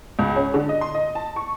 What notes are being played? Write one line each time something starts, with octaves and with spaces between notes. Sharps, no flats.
C#2
C#4
D3
D#5
C6
D#5
A5
C#6